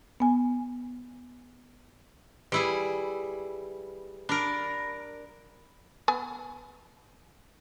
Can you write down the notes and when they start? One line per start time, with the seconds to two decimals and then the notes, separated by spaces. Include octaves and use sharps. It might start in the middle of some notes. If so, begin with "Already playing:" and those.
0.20 B3 G#5
2.52 G3 E4 G#4 B4
4.29 D4 A#4 B5 A#6 D7
6.08 B3 G#5